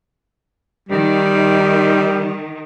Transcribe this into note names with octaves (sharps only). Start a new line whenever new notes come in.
D#3 G3